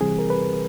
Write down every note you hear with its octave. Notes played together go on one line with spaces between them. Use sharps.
C3 E3 G3 C4 G#4
A#4
B4